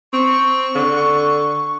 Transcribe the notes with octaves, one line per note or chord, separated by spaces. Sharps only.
C4 C#6
D3